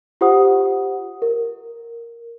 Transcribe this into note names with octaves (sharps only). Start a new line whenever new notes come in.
F4 G4 C5 F#5 D#6
A#4